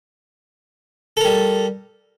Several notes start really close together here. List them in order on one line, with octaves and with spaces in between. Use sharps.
A4 A#4 G3